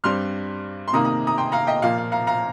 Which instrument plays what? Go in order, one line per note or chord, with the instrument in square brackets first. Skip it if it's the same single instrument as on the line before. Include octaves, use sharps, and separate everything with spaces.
[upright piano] G2 G3 C4 C6 F6
C6
C3 D#3 A#3 A#5 D#6
A#5 D#6
A#5 D#6
G5 C6
F5 A#5
D#5 G5
A#2 F3 A#3 F5
F5
F5 A#5
F5 A#5